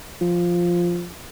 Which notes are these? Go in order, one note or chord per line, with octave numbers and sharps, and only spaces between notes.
F3